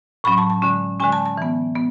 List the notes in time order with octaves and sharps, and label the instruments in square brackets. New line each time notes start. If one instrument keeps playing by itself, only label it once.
[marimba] A2 F#3 C#4 B5
A5
A5
D3 G#3 C#4
D3 G#3 C#4 G#5
A5
A5
E3 B3
B3